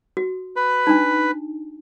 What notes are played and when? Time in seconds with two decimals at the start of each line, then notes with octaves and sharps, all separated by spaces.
0.17 F#4
0.56 B4 B5
0.87 D4 D#4